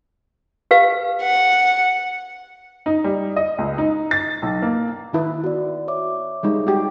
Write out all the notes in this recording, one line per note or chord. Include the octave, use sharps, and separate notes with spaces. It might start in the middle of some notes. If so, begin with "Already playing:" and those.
G4 B4 F5
F#5
D#4
G3
D#5
C#2
D#4
A6
B1
A#3
D#3 E4 B4
B3 F#4 D5
C#5 E5 D6
G3 G#3 D#4
F#4 G4